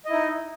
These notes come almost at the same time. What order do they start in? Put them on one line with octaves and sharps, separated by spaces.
D#5 E4 D#4